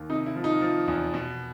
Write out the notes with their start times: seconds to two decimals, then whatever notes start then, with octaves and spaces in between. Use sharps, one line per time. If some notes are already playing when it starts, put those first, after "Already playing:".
Already playing: D#2
0.10 C3 D#4
0.26 E4
0.36 F3
0.44 D#4
0.61 F3
0.88 E2
1.14 B2